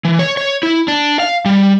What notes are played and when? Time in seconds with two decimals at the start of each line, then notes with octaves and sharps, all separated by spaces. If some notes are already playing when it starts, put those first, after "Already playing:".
0.05 E3
0.19 C#5
0.37 C#5
0.63 E4
0.88 D4
1.20 F5
1.45 G3